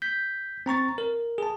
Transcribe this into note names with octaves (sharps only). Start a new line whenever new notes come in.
G6 B6
C4 A#5 C#6 A6
A#4
G#4 A5